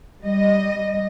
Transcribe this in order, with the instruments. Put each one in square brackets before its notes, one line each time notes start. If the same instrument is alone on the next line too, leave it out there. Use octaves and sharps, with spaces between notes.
[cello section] G3 D#5